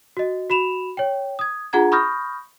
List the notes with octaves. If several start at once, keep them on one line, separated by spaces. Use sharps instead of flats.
F#4 D#5
F#4 B5 E7 F7
C#5 G5
D#6 G#6
D4 F4 G#4 F#5 A#5 G#6
B5 C#6 D#6 F6 G6 A#6